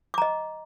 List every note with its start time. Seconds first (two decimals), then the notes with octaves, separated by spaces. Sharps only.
0.14 D6
0.18 A#5
0.22 D#5